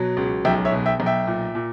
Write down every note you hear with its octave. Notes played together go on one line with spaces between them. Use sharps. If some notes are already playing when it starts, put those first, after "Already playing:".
Already playing: B2 F#3
C#2
B1 E5 G5
C#5 E5
B2
E5 G5
B1
E5 G5
A#2
A#2